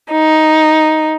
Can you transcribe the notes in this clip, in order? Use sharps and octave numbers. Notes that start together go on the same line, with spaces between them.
D#4